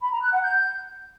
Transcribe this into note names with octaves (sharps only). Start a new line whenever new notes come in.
B5
A#5
F#6
F#5
G6